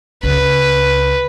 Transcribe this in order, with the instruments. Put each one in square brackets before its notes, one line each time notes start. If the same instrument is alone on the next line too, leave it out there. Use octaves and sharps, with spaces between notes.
[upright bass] C#2 [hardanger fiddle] B4